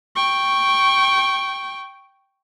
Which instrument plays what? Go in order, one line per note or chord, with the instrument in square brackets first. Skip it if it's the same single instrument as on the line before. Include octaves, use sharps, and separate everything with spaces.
[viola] G5 C#6